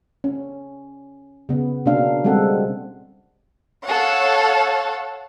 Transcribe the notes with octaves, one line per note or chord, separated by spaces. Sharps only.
C#4
C#3 B3
B2 A#3 C#4 D4 F5
G3 G#3 C4 A4 F#5
A4 C#5 F5 F#5